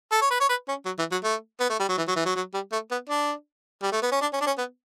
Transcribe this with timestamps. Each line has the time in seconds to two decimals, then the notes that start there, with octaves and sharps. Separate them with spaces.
0.12 A4
0.21 C#5
0.31 B4
0.40 C#5
0.49 B4
0.68 C#4
0.86 F#3
0.99 E3
1.12 F#3
1.24 A3
1.60 B3
1.70 A3
1.80 G3
1.89 F#3
1.98 E3
2.08 F#3
2.16 E3
2.26 F#3
2.36 F#3
2.54 G3
2.72 A3
2.91 B3
3.09 D4
3.83 G3
3.92 A3
4.02 B3
4.12 C#4
4.21 D4
4.33 C#4
4.41 D4
4.46 C#4
4.58 B3